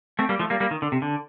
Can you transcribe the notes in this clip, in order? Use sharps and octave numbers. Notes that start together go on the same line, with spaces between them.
A3 C4
G3 A#3
F3 A3
G3 A#3
G3 A#3
D#3
D3
C3
D3